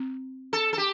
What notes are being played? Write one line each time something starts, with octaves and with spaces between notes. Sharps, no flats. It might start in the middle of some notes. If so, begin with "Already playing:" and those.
Already playing: C4
A4
A4
G4